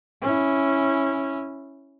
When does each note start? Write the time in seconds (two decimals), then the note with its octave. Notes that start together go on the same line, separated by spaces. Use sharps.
0.22 C#4 E4